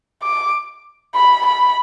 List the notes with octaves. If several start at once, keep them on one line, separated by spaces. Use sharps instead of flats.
D6
B5
B5